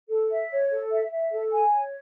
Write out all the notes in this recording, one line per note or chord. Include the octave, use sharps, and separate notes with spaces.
A4
E5
C#5
A4
E5
E5
A4
G#5
C#5